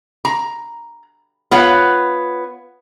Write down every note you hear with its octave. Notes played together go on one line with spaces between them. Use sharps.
A#5
B3 F4 C#5 F#5